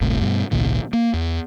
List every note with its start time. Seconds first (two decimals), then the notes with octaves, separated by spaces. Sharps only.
0.01 D1 G1 A2 C3
0.22 G2 B2
0.51 G#1 C#2 A#2 D#3
0.93 A#3
1.14 E2